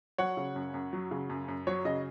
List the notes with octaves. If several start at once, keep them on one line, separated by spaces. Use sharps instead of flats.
F#3 C#5 F#5
C#3
F#2
F#2
F#3
C#3
F#2
F#2
F#3 C#5
C#3 D#5